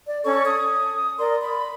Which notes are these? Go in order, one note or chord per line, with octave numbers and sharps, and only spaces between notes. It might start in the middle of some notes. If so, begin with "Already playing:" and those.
D5
C#4 A4 C#5 C#6
D#6
A#4 D5 C6
B5